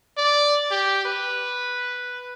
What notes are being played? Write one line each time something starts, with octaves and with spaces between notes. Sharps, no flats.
D5
G4
B4